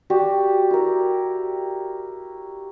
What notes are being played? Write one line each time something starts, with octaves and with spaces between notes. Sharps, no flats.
F#4 G4 D5
E4 A#4